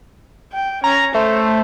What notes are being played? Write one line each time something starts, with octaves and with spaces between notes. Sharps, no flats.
G5
C#4 A#5
A3 C5